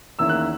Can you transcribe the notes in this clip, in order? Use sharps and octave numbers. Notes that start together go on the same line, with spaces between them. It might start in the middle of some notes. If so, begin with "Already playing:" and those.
E2 D#3 A#3 C#4 E4 E6
F#6